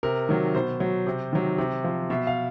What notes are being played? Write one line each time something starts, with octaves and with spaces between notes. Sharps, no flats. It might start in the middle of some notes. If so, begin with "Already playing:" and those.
C3 A#4
D#3 F#3
B2 C5
F#3
C3
D#3 F#3
C3
F3
B2 E5
F5